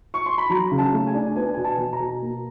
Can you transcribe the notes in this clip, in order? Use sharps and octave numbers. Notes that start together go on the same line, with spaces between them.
C#6
C6
B5
F#3 A#5
C#3
A5
A3
G#5
D4
B3 G#5
B2 G#5
A5
B2
A#5
B2
A#3